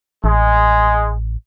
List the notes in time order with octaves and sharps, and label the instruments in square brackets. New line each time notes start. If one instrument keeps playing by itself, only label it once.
[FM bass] A1 [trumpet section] G#3